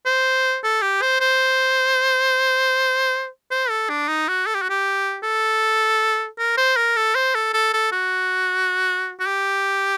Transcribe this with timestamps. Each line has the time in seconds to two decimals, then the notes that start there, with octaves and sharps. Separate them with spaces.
0.06 C5
0.63 A4
0.81 G4
1.02 C5
1.20 C5
3.51 C5
3.69 A4
3.89 D4
4.08 D#4
4.28 F#4
4.46 A4
4.54 G4
4.62 F#4
4.70 G4
5.23 A4
6.39 A#4
6.57 C5
6.76 A#4
6.96 A4
7.15 C5
7.34 A4
7.53 A4
7.73 A4
7.92 F#4
9.20 F#4
9.26 G4